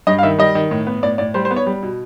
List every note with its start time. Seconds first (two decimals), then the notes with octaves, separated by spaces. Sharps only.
0.07 G2 D#5
0.18 F5
0.23 D#3 E5
0.38 G3 D#5
0.55 D#3
0.71 A2
0.87 B3
1.03 A2 D5
1.18 A2 D5
1.34 G3 C5
1.45 C5
1.51 B3
1.56 C#5
1.67 G3
1.83 B2